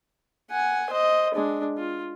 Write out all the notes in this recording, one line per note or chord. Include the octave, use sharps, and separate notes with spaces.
F#5 G#5
C5 D#5
G#3 D4
F4